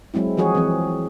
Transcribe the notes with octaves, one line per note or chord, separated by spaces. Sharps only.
F#3 G#3 C4 E4
E3 F3 F#4 G#4 C#5
E3 F3 C4